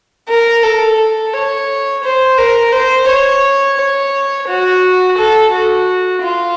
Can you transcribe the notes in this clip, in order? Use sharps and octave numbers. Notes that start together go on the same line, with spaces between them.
A#4
A4
A4
C#5
C5
A#4
C5
C#5
C#5
F#4
A4
F#4
F4